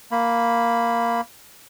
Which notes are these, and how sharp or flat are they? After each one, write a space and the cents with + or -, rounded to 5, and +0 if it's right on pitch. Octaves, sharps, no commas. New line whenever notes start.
A#3 +0 B5 +0